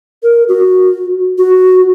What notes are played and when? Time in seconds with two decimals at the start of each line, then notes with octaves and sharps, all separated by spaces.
0.23 A#4
0.48 F#4
1.38 F#4